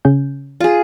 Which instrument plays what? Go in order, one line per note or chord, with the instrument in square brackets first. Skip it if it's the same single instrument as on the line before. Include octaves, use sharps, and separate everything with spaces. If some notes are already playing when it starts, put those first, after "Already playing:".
[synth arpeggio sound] C#3 C#4 G6
[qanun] F4 G#4